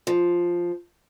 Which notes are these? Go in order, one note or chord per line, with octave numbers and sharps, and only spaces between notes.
F3